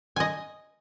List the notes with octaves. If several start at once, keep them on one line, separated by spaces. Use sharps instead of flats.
D#5 G#5